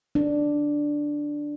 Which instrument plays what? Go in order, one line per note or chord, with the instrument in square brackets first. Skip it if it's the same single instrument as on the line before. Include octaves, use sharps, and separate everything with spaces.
[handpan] D4